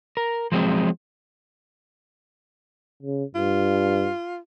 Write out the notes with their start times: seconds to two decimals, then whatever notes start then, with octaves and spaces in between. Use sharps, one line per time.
0.17 A#4
0.52 F3 F#3 G#3 C4
3.03 C#3
3.35 G2 F4